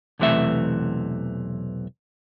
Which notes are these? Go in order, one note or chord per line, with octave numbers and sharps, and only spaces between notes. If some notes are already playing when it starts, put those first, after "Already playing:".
B1 E2 C3 E3 A3 E5